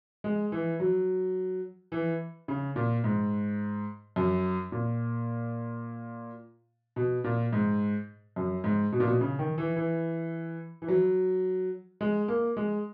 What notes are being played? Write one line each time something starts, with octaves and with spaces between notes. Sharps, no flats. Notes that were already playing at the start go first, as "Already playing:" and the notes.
G#3
E3
F#3
E3
C#3
A#2
G#2
F#2
A#2
B2
A#2
G#2
F#2
G#2
B2
A#2
B2
C#3
D#3
E3
E3
E3
F#3
G#3
A#3
G#3